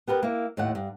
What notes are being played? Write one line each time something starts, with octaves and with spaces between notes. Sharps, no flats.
B3 G4 A#4 B4
A#3 E4
D#2 A2 F#5
G2